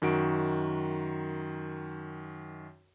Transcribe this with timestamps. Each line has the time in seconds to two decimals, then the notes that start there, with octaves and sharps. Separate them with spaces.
0.02 F#2 D#3 F#4 D7